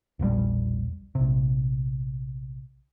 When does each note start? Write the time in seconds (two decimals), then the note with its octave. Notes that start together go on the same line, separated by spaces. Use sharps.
0.19 E1 A#1 A2 G3
1.15 A#1 C3